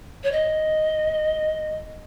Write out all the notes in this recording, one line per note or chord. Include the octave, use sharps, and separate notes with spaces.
C#5
D#5